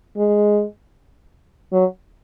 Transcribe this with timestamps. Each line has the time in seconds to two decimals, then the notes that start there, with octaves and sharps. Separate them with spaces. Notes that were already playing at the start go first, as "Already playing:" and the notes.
0.17 G#3
1.73 F#3